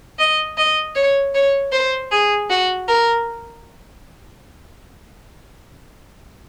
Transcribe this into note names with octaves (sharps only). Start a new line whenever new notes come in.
D#5
D#5
C#5
C#5
C5
G#4
F#4
A#4